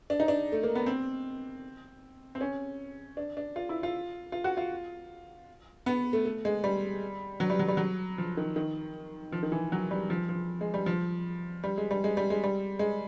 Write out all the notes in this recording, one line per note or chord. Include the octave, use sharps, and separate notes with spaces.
D4
D#4
D4
A3
A#3
B3
C4
C4
C#4
D4
D4
F4
E4
F4
F4
F#4
F4
B3
A3
A3
G#3
G3
F#3
G3
F#3
G3
F#3
F3
D#3
D#3
F3
D#3
E3
F#3
G3
F3
F3
G#3
G3
F3
G3
G#3
G3
G#3
G3
G#3
G3
G#3